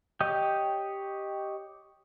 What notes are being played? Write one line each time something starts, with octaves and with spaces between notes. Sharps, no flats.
G4 C#5 D#5 G5